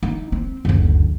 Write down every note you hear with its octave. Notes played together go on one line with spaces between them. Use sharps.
D#4
C4
F#1 D2